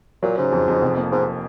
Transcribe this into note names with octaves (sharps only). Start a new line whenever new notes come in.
A#2 F#3
G#2 C#3
F2
F2
F1
A#3
G#2 A#3